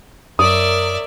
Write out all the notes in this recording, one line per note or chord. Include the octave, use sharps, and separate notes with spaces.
F#2 A#4 C#5 D5 E5 D#6